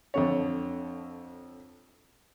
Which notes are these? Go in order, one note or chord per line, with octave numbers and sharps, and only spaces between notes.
F2 D3 C#5